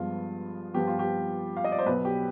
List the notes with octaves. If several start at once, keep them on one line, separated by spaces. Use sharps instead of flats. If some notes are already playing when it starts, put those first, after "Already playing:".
Already playing: G2 F3 G#3 B3 F4
G2 F3 B3 G4
F4
G4
F5
D#5
D5
C5
B1 B2 B3 B4
G4